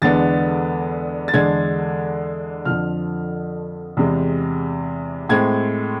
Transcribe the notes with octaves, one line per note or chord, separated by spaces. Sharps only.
E2 D3 G#3 B3 D4 A6
A6
E2 D3 G#3 D4 G#6
F2 D3 F3 F6
E2 C3 G#3
A2 G#3 C4 G#6